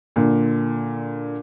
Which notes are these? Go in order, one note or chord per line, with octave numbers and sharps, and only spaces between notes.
A#2 D3